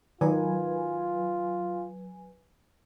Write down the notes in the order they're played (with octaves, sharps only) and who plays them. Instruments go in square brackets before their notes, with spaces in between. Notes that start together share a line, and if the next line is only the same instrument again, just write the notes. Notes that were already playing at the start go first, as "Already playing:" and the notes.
[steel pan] D#3 [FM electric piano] F#3 B4 G#5 [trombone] F4